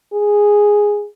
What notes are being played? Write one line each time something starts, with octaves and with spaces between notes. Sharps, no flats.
G#4